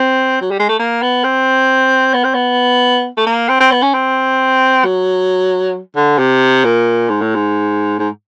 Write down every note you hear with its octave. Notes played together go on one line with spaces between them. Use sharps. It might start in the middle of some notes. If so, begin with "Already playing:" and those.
Already playing: C4
F#3
G3
G#3
A3
A#3
B3
C4
B3
C4
B3
A3
A#3
C4
C4
B3
C#4
C4
F#3
D3
C3
A#2
G#2
A2
G#2
G#2